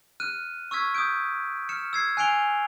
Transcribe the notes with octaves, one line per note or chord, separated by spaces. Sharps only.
F6 F#6 D#7
C#6 E6 F6 G#6 B6
D#6 E6 G6 D7
F6 C#7 E7
E6 G#6 C7
G#5 F#6 C7 D7 F7 G7